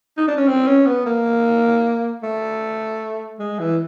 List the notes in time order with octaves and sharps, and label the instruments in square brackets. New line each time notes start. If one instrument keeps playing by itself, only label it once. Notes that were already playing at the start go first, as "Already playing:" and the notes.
[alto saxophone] D#4
D4
C#4
C4
C#4
B3
A#3
A3
G#3
E3